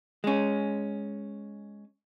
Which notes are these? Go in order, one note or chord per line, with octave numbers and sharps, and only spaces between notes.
G#3 C#4